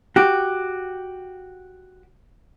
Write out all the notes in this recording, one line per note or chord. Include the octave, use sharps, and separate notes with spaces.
F#4 G4